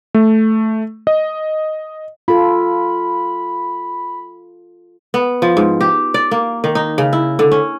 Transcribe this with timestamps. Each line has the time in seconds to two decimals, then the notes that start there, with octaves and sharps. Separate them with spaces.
0.14 A3
1.07 D#5
2.28 F4 A4 B5
5.14 B3
5.42 F3
5.57 G#2
5.81 G4
6.14 D5
6.31 A#3
6.64 D#3
6.75 D#4
6.98 C#3
7.13 E4
7.39 D3
7.52 C#4